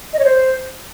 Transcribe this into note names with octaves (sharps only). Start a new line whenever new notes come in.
D#5
C#5
C5